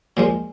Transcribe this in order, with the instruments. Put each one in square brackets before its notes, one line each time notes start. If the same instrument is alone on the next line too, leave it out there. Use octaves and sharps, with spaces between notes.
[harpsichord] A#2 F3 G#3